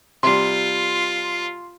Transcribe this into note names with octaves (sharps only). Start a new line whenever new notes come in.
C3 G3 F4 C6